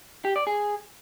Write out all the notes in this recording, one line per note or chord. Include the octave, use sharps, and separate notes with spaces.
G4
D5
G#4